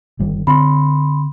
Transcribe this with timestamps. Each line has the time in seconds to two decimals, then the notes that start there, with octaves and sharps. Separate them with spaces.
0.19 G1 D#3 G3
0.47 D3 C4 B5 C6